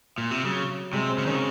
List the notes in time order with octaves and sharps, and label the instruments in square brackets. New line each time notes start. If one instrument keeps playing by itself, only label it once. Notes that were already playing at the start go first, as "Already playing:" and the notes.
[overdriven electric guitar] A#2
C3
[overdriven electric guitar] C#3 [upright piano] F#3
[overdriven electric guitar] C3 [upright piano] G#3
[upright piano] C4
[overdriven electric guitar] C#3
[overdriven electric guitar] D#3 [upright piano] C#4
[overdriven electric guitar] C#3